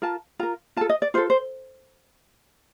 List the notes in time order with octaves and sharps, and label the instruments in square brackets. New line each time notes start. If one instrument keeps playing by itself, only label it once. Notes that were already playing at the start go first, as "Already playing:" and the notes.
[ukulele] F4 A#4 A5
F4 A#4 A#5
F4 A5
A4
D#5
D5
F4 C5
A4
C5